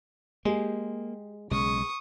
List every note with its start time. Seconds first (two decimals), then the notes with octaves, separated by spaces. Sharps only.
0.45 G#3 A#3 G4 G#4
1.51 B1 C#3 G#3 C#4 C#6 D#6